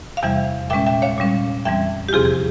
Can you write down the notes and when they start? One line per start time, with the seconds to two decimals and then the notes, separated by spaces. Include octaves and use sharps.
0.17 F5
0.23 E2 C3 E3 G3 E5 G5
0.70 A#2 G#3 C#4 E5 G5
0.86 E5 G5
1.02 C#5 F5
1.18 A#2 G3 C#4
1.65 F2 E3 G3 C4 E5 G5
2.09 G4
2.13 E2 C3 F3 C4 F4 G#4
2.25 G#4